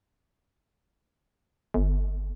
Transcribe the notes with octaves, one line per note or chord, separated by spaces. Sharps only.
G1